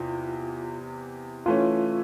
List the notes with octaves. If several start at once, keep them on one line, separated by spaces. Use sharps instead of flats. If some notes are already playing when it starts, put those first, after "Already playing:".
Already playing: E2 C3 F4
E3 A3 C#4 F4